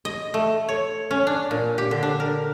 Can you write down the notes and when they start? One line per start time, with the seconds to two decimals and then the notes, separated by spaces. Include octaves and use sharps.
0.05 D#5
0.34 A3
0.69 C#5
1.11 C#4
1.27 D4
1.51 A#2
1.78 G4
1.91 D3
2.03 D4
2.20 A#4